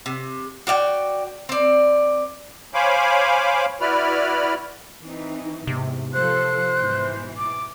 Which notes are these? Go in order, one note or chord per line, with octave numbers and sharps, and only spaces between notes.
C3
F#4 D5 F5 G5
C4 D5
C5 C#5 F5 G#5 B5 D6
E4 F#4 B4 D5 B5 F6
E3 C4 D#4
E2 G#2 C3
F3 A4 C5 F#6
G#2 B2 E3
D6